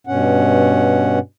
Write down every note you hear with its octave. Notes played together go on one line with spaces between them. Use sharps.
G2 B2 C#4 F#5